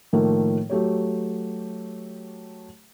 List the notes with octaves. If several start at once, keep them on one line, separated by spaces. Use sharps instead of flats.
A2 D#3 F3 A3 A#3
F#3 A3 G4 C#5